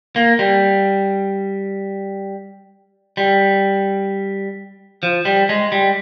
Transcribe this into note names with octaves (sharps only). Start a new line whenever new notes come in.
A#3
G3
G3
F3
G3
G#3
G3